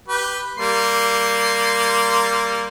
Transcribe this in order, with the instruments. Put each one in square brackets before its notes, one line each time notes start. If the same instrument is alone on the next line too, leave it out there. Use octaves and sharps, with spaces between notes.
[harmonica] G4 B4
G3 A#3 C6